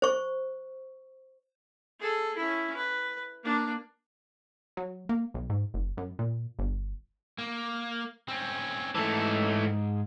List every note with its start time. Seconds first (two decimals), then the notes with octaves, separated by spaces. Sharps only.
0.02 C5 C#6
2.00 G#4 A4
2.37 C#4 E4
2.76 B4
3.44 A#3 D4
4.77 F#3
5.09 A#3
5.34 B1
5.50 G#2
5.74 F#1
5.97 F#2
6.19 A#2
6.59 G1
7.38 A#3
8.28 C4 C#4
8.95 G#2 E3 A3 A5